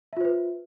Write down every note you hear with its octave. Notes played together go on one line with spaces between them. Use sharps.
F4 B4 C5 E5